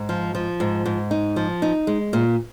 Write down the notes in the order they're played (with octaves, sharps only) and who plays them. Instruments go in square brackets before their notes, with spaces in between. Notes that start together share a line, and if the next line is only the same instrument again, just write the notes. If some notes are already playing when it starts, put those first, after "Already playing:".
Already playing: [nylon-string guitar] G#2
F3
F3
G#2
G#2
D#4
F3
D#4
G#3
A#2